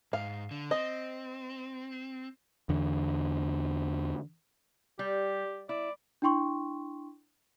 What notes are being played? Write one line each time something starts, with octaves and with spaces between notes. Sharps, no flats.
G#2 F5
D3
C4 D#5
E2 D3
G3 G4
E4 D5
D4 E4 G5 C6 C#6